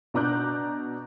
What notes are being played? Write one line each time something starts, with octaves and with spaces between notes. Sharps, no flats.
B2 D4 A#5 D6 F#6 G6